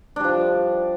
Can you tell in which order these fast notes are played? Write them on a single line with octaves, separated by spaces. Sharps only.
D4 G3 F3